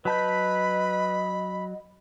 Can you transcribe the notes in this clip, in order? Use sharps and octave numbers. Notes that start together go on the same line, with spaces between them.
F#3 B4 D#5 A5 B5 G6